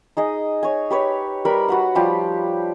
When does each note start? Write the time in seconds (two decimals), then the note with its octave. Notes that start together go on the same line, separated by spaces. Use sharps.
0.17 D#4 G#4 D#5
0.63 C#5 G#5
0.90 G4 B4 C#5
1.45 G3 A#4 B4 B5
1.68 F#4 B4 F#5
1.95 F3 G3 G4